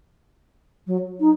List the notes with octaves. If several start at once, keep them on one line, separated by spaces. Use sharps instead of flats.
F#3
D#4